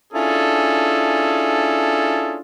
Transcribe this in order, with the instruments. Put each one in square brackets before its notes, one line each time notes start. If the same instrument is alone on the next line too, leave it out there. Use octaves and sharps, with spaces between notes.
[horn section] C#4 D4 E4 F4 G#4 A4